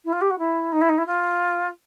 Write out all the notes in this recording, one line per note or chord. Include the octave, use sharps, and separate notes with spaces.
E4
F4
G4
F#4
E4
D#4
E4
D#4
E4
F4